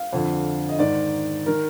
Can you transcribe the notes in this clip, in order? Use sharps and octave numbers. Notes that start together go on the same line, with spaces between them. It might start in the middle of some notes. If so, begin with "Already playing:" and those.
Already playing: F5
F2 D3
D#5
G#2 D#3 D5
D#3 A#4